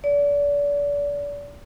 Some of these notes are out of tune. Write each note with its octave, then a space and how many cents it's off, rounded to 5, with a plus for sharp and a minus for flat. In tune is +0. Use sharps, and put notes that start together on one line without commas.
D5 -35